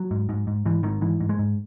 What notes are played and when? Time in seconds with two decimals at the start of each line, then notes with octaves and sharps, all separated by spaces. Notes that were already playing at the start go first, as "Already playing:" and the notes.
Already playing: F#3
0.11 G#2
0.29 G#2
0.47 G#2
0.66 G#2 E3
0.83 G#2 D#3
1.01 G#2 E3
1.20 G#2
1.29 G#3
1.39 G#2